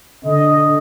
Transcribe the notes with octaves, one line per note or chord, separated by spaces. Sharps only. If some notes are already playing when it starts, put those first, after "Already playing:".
D3 D#5